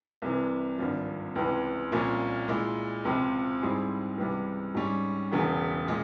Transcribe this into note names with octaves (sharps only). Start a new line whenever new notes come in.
C2 C3 E3
G#1 G2 F3
C#2 C3 E3
C2 A#2 F3 A#3 C#4
A#2 G#3 E4
C#2 C3 F3 C4
G#2 G3 C4 E4 G#4
C#2 C3 E3 G3
G#2 G3 C#4
E1 E2 C#3
A#2 G#3